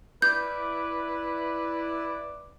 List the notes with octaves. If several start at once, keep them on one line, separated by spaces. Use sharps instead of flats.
E4 B4 D5 G6